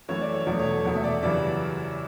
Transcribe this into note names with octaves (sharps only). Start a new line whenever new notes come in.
F#2 E3 A3 C#5
D5
C#5
E2 B2 F#3 A3 D5
C#5
A4
E2 B2 A3
E5
D5
F#2 C#3 E3 G3 D5